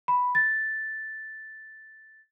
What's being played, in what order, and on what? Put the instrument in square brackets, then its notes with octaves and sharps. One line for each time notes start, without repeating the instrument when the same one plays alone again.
[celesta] B5
A6